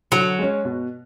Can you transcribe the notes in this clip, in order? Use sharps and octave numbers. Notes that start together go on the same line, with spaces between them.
D3 F#3
G#3 C#4
B2